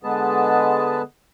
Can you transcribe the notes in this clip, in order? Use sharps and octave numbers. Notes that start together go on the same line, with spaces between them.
D3 G#3 B3 G#4 B4 A5